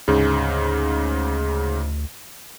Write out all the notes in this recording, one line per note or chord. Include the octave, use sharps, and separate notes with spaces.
D2 G#2 C#3